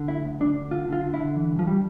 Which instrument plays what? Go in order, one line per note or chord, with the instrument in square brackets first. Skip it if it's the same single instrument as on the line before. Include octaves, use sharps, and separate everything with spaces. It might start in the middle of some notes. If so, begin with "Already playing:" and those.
Already playing: [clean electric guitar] D3
D2 E4
D2
D2 D4
D2
D3 F4
D3 F4
D3
E4
D3
E3
G2
F3
G3